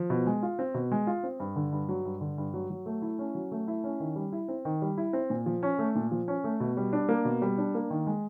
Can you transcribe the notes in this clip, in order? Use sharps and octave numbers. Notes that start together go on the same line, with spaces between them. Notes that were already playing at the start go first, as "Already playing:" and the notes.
Already playing: F3
B2
G#3
F4
C4
B2
G#3
F4
C4
G2
D3
G2
F#3
G2
D3
G2
F#3
F#3
A3
E4
C#4
F#3
A3
E4
C#4
D#3
G3
E4
C4
D#3
G3
E4
C4
A#2
F3
C#4
A3
A#2
F3
C#4
A3
B2
G3
D4
A#3
B2
G3
D4
A#3
D#3
G#3